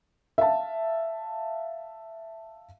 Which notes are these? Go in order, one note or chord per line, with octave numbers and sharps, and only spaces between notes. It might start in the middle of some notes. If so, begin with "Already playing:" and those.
E5 F5 A5